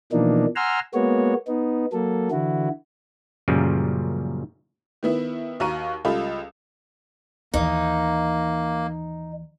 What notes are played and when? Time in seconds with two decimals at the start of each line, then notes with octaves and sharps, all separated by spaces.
0.12 B2 E3 F3 A#3 D4 D#4
0.56 F#5 G#5 A#5 C6 E6 F6
0.94 G#3 A#3 B3 F#4 C#5
1.48 B3 D#4
1.93 F#3 A#3 A4
2.31 D3 E3 E4 F#4
3.48 F#2 A#2 C#3 F3 G3
5.03 D#3 B3 E4
5.60 D#2 F#4 F5 A#5 C#6 D#7
6.05 C#2 G3 F4 A4 B5
7.54 D#2 E3 A#3 D#4